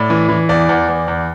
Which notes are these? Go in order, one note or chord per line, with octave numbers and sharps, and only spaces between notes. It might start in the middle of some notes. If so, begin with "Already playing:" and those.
Already playing: A2 D5
E3
E3
E2 D5
E2
E2
E2